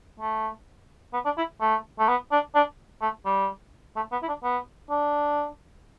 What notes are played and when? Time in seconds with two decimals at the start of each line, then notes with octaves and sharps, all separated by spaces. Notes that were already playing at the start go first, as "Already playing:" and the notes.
0.20 A3
1.13 B3
1.25 D4
1.37 E4
1.61 A3
1.99 A3
2.08 B3
2.32 D4
2.55 D4
3.01 A3
3.25 G3
3.96 A3
4.12 B3
4.22 E4
4.28 D4
4.43 B3
4.90 D4